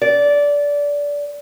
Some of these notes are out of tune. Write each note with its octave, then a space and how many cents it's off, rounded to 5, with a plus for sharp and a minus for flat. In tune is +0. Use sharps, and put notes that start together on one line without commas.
D5 -20